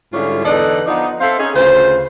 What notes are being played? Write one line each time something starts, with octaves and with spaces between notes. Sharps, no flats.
G#2 D3 G3 C#4 E4 F4
E2 D3 D#4 A4 B4 D5
F3 B3 D4 D#4
C4 A4 C5 E5 F5
C#4 D#4 G#4
D2 C#3 F4 B4 C5